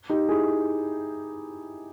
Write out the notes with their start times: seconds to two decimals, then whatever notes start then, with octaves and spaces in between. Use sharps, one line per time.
0.10 D#4 G4
0.29 E4 G#4